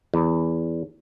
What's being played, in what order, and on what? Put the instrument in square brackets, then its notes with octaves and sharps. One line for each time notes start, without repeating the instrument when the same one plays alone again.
[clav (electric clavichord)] E2